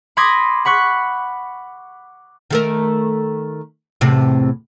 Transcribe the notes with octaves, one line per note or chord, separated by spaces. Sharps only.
B5 C6 D6 D#6 G#6 A#6
F#5 B5 C#6 F#6
D#3 A3 A#4
E2 A2 C3